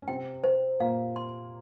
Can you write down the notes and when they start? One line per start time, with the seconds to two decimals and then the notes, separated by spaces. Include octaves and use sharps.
0.02 C#4
0.08 C3 C4 G5
0.44 C5
0.80 A#2 A#3 F5
1.16 C6